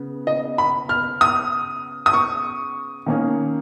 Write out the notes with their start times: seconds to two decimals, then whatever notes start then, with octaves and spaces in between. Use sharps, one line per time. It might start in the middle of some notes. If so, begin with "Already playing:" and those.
Already playing: C#3 B3
0.27 D#5
0.58 B5
0.89 F6
1.21 D#6
2.06 D#6
2.13 C#6
3.06 D#3 A#3 C#4